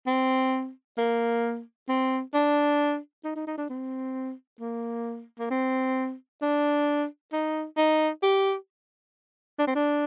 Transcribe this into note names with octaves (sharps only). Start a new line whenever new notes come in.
C4
A#3
C4
D4
D#4
D#4
D#4
D4
C4
A#3
A#3
C4
D4
D#4
D#4
G4
D4
C4
D4